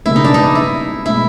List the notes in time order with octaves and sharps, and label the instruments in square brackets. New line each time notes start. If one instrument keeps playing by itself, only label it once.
[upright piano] C#2 B2 G3 A#3 C#4 [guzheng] E4
[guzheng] D#4
D4
D#4
E4
[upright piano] B2 G#3 [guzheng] E4